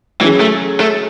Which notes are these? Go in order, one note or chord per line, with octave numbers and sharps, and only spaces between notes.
E3 F#3 C#4 G#4
A3
A3